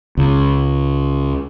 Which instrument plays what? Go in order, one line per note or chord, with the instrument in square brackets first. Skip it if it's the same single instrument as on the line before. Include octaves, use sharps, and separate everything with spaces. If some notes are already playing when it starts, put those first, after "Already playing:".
[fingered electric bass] C#2